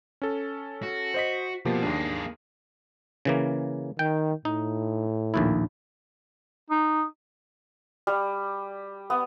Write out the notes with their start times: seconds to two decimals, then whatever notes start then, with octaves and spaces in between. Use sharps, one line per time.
0.22 C#4 A4
0.83 F#4
1.14 C5 D#5 B6
1.65 B2 F3 A#3 G4
1.83 D#2 A#3 D4 G#4
3.25 C#3 E3 A#3
3.99 D#3 G5
4.45 A2 D#4
5.34 A#1 D#2 E4
6.70 D#4
8.07 G3
9.10 B3